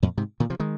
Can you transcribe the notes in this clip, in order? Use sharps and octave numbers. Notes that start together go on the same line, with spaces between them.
F2 A#2
G#2 C3
A#2 D#3
C3 F3
D#3 G#3